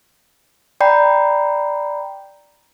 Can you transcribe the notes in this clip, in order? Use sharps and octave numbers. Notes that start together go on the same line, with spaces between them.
D5 G5 A#5 B5 G6 C7